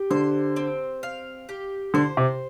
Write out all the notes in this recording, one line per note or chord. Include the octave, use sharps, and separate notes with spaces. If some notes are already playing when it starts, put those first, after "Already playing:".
Already playing: G4
D3 C5
C4
F5
G4
D3 C5
C3